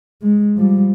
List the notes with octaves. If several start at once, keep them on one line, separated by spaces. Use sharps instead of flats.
G#3
F3 G3